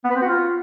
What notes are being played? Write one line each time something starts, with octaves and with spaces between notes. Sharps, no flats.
B3
B4
C4
F#4
F4